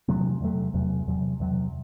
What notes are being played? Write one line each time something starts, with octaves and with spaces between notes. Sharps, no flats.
E2 C3 F#3 A3
E2 C3 F#3 A3
E2 C3 F#3
E2 C3 F#3
E2 C3 F#3